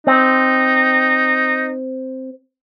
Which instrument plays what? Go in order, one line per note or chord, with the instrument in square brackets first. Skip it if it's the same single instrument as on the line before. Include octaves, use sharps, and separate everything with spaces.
[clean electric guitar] C4 [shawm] D#4